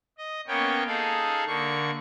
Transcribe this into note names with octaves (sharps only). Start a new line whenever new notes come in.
D#5
A#3 B3 C#4 C#5 G5
D#4 G#4 A4 F5
D3 A#3 C#6